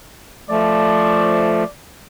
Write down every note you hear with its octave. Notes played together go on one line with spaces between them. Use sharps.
F3 A3 D5